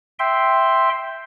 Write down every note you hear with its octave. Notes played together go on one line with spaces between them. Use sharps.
E5 G5 C6